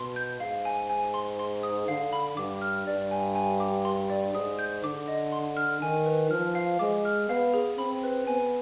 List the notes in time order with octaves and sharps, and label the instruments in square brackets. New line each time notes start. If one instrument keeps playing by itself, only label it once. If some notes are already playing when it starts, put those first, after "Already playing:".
Already playing: [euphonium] B2 [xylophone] C6
[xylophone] G6
[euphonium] G#2 [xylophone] F5
[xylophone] G#5
G#5
C6
C6
D#6
[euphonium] D3 [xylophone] F5
[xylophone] B5
[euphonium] G2 [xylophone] D6
[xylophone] F6
[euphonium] G2 [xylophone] D5
[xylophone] G#5
G#5
D6
C6
D5
[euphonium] G#2 [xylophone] D#6
[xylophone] G6
[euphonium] D3 [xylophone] D6
[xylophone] D#5
C6
F6
[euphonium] D#3 [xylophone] G#5
[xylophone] B4
[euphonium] F3 [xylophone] F6
[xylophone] F5
[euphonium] G#3 [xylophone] D6
[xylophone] F6
[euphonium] B3 [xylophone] F5
[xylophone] G#4
[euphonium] C4 [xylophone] B5
[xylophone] B4
[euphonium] B3 [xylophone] G#5